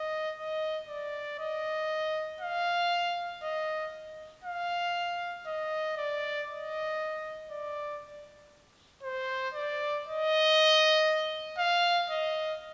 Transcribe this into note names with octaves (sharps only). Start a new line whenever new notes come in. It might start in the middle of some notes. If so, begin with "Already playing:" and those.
Already playing: D#5
D#5
D5
D#5
F5
D#5
F5
D#5
D5
D#5
D5
C5
D5
D#5
F5
D#5